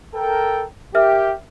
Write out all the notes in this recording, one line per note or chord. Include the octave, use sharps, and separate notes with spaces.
A4 A#4 G5
G4 A#4 E5 F6